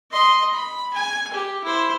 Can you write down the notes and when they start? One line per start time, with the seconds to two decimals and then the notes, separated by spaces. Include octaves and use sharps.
0.11 D#5 C6
0.53 B5
0.93 G#5
1.33 G4
1.64 E4 C5